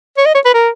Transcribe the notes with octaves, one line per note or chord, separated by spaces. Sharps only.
C#5
D#5
C#5
B4
A#4